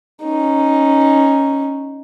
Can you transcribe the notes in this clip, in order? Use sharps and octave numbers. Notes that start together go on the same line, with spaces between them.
C#4 D#4